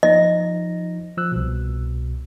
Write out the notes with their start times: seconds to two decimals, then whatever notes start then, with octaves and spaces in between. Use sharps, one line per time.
0.03 F3 D#4 D#5 A#6
1.17 F3 E6 F#6
1.32 C2 B2